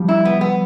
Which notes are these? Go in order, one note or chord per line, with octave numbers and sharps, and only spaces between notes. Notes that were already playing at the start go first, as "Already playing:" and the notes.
Already playing: F3 G3
E4
B3
B3